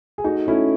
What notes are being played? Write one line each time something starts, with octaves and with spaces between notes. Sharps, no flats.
G#4
A3 D#4 F#4
A3 C#4 E4